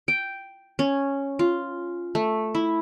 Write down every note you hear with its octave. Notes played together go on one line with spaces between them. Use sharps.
G5
C#4
F4
A3
E4